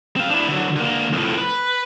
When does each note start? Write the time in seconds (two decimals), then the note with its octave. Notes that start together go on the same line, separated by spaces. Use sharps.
0.16 C4 F5
0.29 D4 E4
0.49 D3 F#3
0.76 D3 A#3
1.13 F2 A2
1.38 B4